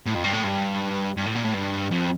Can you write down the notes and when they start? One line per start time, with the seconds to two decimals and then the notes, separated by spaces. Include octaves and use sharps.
0.07 A2
0.15 F2
0.24 G2
0.34 A2
0.44 G2
1.17 G2
1.26 A2
1.35 A#2
1.44 A2
1.53 G2
1.91 F2